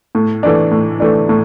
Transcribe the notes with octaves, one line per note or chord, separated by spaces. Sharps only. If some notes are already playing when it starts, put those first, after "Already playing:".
A2
E3 A3 D4
A2
E3 A3 D4
A2